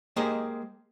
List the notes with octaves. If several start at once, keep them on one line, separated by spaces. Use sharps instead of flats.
G#3 A#3 G4 G#4 C5 D#5